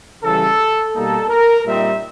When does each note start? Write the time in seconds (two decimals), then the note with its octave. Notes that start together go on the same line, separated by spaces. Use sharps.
0.22 C#3 E3 G3 A4
0.93 B2 G3 A#3 D#4 A4
1.28 A#4
1.64 A#2 G3 C4 D#4 E5